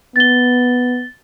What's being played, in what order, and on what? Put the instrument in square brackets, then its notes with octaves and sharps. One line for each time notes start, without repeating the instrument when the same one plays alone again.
[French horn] B3 [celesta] A6 G7